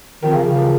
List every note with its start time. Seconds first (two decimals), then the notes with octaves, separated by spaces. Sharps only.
0.22 D#3 F3 C4 G4 A#4
0.33 C#3
0.44 C#3
0.56 F3 C4 G4 A#4